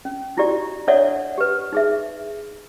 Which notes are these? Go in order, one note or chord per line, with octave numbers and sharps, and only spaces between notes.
C#4
D#4 E4 F#4 G4 D5
D4 A4 C#5 D5 E5 F#5
G4 B4
D#4 G#4 E5